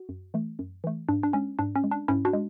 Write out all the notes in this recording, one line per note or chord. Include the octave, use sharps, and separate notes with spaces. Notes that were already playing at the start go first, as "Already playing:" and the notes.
Already playing: F#4
F#2
E3 A3
F#2
E3 A3
G#2 D4
D4
G#3 C#4
G#2 D4
C#4
G#3
D4
G#2 C#4 E4
D4 F#4
G#3